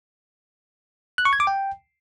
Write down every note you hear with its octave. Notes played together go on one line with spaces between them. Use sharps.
F#6
C#6
G#6
D6
G5